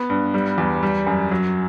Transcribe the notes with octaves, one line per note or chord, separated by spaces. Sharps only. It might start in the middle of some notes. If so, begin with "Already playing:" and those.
Already playing: B3
G2
G3
E2
G3
F#2
F#3